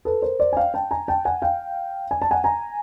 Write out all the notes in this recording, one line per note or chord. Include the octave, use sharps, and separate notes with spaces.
A4 B4
A#4 C5
C5 D5
G#5
F5 G5
G5 A5
G#5 A#5
G5 A5
F#5 G#5
F5 G5
G#5
A5
F#5 G#5
G#5 A#5